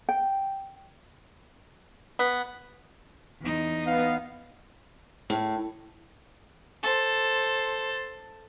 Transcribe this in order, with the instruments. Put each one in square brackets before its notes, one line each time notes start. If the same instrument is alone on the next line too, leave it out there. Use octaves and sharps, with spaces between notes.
[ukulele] G5
[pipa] B3
[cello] E2 D#4
[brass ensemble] B3 [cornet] F5
[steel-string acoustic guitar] A2
[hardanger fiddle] A4 C5